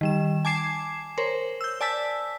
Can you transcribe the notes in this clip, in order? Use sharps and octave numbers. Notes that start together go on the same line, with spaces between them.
D#3 G3 E7
G#5 A5 D6 G#6 C7 E7
A#4 C5 C#5
E6 G6
D5 G#5 A5 E6 B6